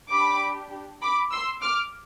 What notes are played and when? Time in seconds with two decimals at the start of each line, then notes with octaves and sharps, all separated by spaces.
0.10 D4 G4 B5 D6
1.01 B5 D6
1.32 C6 E6
1.61 D6 F6